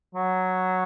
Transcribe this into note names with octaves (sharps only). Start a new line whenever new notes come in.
F#3